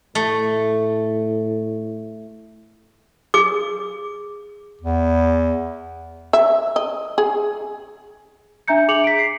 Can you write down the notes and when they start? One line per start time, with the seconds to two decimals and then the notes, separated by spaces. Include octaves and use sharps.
0.15 A2 A3
3.34 G#4 D6
4.82 E2
6.33 E5
6.76 D#5
7.18 G#4
8.68 D4 E5 A#5 G6 C#7
8.88 G#4 D6 C#7 F7 F#7
9.04 B6 D7
9.19 C7